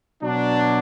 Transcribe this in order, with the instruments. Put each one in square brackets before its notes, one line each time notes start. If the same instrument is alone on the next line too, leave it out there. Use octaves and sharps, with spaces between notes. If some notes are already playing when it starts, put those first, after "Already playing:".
[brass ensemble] B2 F#3 D4